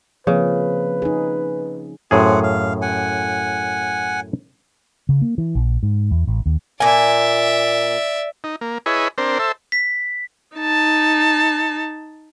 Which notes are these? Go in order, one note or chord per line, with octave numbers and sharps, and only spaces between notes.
C#3 F3 A#3 C4 B4
D#4 G#4
F#2 A2 C4 F4 G#4 F#5
F5
F#5 G#5
C#3
A#3
E3
A#1
G#2
E2
A1
D#2
A#2 D5 E5 G#5
D#4
A#3
E4 G#4 B4 C#5 D#5
C4 D4 A#4 C5
A4 C5 E5
B6
D#4 A5